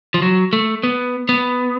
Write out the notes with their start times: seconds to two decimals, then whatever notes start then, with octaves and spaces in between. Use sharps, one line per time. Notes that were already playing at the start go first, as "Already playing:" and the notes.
0.14 F3
0.22 F#3
0.53 A3
0.83 B3
1.29 B3